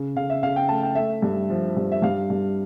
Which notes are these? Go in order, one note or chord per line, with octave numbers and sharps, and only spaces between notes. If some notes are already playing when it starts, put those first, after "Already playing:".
Already playing: C#3
C#3 F5
E5
C#3 F5
G5
A3 A5
G5
A3 E5
G2
F3
G2
E5
G2 F5
G2